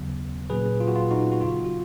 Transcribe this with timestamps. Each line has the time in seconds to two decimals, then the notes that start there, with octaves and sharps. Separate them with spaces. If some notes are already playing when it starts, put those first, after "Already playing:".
Already playing: D#2 C#3 F#3 B3
0.50 A#2 F#3 A#3 C#4 G#4 B4
0.80 F4
0.88 F#4
0.96 F4
1.11 D#4 F#4
1.32 F#4
1.41 F2 C#3 F#3 B3 F4
1.64 F#4